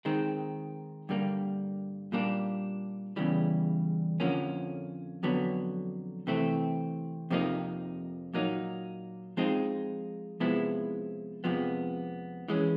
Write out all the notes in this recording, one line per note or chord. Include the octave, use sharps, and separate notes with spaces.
D#3 G#3 C4
G2 D3 G3 A#3
A#2 G3 A#3 D4
E2 C#3 E3 G3
F2 D3 F3 A#3 C#4
F2 D3 F#3 B3
C3 E3 A3 C4
F2 C3 F3 A#3 D#4
A#2 F#3 A#3 D#4
F3 G#3 C4 D#4
C3 F3 G#3 B3 E4
F2 C3 F3 G#3 B3
E3 G#3 C#4